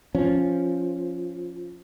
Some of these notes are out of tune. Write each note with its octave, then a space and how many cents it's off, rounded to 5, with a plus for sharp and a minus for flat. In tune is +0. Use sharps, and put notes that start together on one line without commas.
F3 +0 C#4 +0